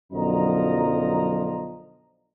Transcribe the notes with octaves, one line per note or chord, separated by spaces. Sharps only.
B1 F#2 D3 F3 D#5 A#5